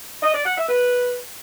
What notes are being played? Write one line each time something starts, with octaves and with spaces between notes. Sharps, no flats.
D#5
D5
F#5
E5
B4